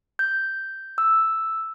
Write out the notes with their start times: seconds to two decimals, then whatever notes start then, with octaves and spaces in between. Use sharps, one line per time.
0.19 G6
0.98 E6